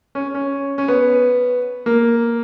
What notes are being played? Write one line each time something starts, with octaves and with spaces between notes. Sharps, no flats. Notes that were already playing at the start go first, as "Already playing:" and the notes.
C#4
C#4
C#4
B3
A#3